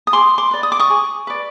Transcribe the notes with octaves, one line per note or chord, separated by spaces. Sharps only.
D#6
G#4 C6 D6
C6 D6
B4 D5
D#6
D6
C#6 D#6
G#4
B4 D5